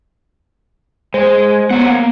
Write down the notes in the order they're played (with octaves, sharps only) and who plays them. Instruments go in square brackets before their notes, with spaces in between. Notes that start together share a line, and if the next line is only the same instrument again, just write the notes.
[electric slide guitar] G#3 [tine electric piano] C5
[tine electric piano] B3 [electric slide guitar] C5 C#5 F#5
[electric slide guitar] A#3